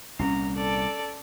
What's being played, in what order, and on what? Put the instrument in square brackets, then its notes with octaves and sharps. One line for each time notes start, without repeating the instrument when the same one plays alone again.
[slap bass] C2 A#2 [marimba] C#4 [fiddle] A#5
[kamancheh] A4 [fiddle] D5